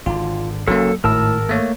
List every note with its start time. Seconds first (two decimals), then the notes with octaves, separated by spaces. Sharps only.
0.06 G#1 D3 F4
0.68 F#1 C3 F#3 A#3 C#4 A4
1.04 G#1 A2 A#4 A5 E6
1.49 A3 A#3 C#5